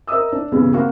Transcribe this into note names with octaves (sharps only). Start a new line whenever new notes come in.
A#4 D#5 E5 D#6 E6
D4
B1 E2 G2 C#3
A#3 C4 F#4 F5